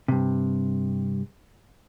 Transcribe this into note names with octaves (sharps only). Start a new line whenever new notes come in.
G2 C3